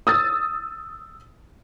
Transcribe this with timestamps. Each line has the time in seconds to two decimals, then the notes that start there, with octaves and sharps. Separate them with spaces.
0.07 D#6 E6 A6